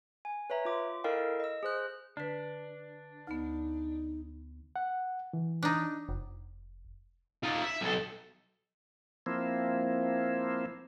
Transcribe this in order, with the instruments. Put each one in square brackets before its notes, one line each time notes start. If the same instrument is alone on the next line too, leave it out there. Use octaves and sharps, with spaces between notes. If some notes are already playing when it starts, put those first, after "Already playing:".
[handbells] G#5
B4 C#5 E5 A#5
F4 D6
E4 A4 A#4 D#5 F5 G5
D#5 E6
G#4 C5 F#6
[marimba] D3 B4 [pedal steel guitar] D4
[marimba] D2 B3 [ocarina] D#4
[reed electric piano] F#5
E3
[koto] D4 D#4
[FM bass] F1
[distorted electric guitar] D#4 F4
E5
B1 A4
[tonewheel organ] F3 A#3 C4 E4